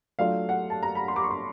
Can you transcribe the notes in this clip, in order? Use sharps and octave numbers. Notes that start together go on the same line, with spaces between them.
F#3 A3 D4 F4 F5
F#5
A5
A#5
B5
C6
D6
C#6
C6